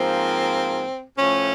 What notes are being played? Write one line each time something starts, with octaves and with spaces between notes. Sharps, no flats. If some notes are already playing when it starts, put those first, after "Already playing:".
Already playing: G#2 F3 A#3 C4
A2 F3 A3 C#4